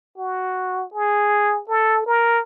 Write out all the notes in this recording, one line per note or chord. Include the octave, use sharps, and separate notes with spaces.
F#4
G#4
A4
A#4